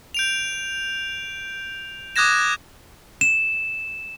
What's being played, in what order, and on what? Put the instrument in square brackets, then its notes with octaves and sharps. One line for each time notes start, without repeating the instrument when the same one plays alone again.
[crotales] G6 D7 F7
D6 D#6 F#6 G#6 A#6 E7
[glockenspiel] E7